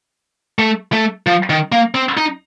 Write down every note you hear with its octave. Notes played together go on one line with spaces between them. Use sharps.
A3
A3
F3
D#3
A#3
C4
D#4